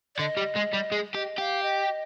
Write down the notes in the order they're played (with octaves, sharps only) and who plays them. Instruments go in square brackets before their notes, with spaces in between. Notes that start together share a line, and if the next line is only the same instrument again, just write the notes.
[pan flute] D5
[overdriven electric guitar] D3 [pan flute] D#5
[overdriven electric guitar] G3
G#3
G3
G#3
[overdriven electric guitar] G4 [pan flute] D#5
[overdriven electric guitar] G4 [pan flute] F5
[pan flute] D#5